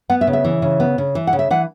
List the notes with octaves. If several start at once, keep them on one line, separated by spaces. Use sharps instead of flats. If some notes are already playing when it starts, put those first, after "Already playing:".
B3 F#5
E5
C#3
E5
E3
C#3
B3
C#3
E3
F#5
C#3
E5
E3 F#5